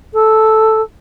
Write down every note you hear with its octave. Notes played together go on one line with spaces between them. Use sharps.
A4